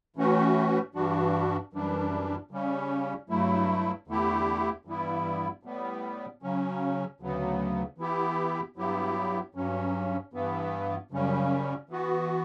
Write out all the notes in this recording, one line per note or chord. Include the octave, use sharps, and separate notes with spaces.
A2 E3 A3 C#4 F#4
G2 E3 G3 D4 F#4
F#2 E3 G3 D4
C#3 G3 C#4
G2 F#3 A3 E4
E2 D3 A3 E4 G4
G2 E3 G3 B3 E4
A2 G3 B3
C#3 F#3 C#4
D2 C#3 F#3 B3
E3 B3 E4 G4
G2 F#3 B3 E4 G4
G2 F#3 C#4
G2 E3 B3
F#2 C#3 G3 C#4
E3 B3 F#4